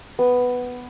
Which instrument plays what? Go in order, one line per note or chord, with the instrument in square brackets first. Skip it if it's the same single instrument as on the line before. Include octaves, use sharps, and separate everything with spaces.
[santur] B3